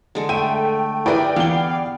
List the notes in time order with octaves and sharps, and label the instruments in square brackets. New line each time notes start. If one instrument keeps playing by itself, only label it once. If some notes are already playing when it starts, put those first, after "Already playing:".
[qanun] D3 G#3 A4
[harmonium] A3 [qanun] E5 [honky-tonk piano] G5 [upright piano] D#7
[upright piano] E4 B4 [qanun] G4 G#4 A#4 [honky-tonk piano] D5 G5
[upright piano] E3 G7 [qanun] B3 [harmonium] F5